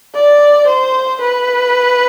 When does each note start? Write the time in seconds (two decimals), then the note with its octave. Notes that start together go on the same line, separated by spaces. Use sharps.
0.15 D5
0.68 C5
1.22 B4